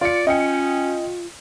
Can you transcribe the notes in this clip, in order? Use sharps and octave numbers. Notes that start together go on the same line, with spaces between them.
F4 D5 C#7
C#4 F4 D#5 G5 C#7